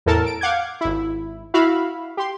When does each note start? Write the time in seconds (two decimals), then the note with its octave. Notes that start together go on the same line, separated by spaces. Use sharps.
0.06 E2 A2 A4 A#4 A5
0.26 D7
0.41 F5 F#5 D6 G6 G#6
0.81 G#1 E4
1.54 E4 F#4 E5 F5 B5
2.17 G4 C6